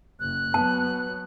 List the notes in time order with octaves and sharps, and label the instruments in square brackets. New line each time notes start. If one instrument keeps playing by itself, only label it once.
[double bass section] F#1 [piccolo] F#6
[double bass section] F#3 B3 [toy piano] A5